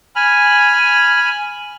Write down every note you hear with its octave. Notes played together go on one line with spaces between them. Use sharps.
G#5 B5 F6